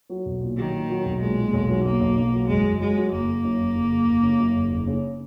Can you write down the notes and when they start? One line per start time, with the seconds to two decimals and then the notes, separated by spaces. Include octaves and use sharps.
0.10 F#3
0.26 B1
0.41 A#2
0.57 D#3 F#3
0.74 A#2
0.90 F#3
1.05 B1
1.21 A#2 G#3
1.36 A#2
1.53 B1
1.69 F#3
1.85 B1 A#3
2.00 B1
2.17 B1
2.33 F#3
2.48 F#1 G#3
2.65 F#1
2.80 F#3 G#3
2.97 F#3
3.12 F#1 A#3
3.28 F#1
3.44 F#2
3.60 F#1
3.76 F#1
3.92 F#1
4.08 F#1
4.23 C#3
4.40 F#2
4.55 F#1
4.71 F#1
4.87 C#3